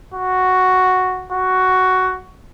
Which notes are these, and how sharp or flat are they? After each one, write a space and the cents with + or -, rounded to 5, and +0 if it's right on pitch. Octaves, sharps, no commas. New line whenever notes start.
F#4 +0
F#4 +10